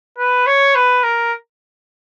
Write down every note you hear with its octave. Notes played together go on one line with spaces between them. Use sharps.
B4
C#5
B4
A#4